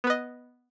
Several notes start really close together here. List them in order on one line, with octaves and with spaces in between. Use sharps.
B3 B4 D#5